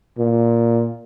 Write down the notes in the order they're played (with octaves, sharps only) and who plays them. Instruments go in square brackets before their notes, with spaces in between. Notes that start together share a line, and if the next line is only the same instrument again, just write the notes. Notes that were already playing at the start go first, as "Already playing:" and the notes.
[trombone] A#2